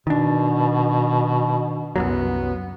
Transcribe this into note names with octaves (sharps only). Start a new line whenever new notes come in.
B2 D#3 D4
C2 F#2 F#3 B3